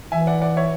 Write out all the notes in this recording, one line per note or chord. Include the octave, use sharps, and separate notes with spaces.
E3 E5 G#5
D5 F#5
D5 F#5
C#5 E5